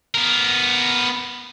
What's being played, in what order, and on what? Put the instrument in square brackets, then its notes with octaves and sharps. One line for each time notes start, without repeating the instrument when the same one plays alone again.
[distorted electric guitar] B3 A#4